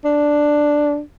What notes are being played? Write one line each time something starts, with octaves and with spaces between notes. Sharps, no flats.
D4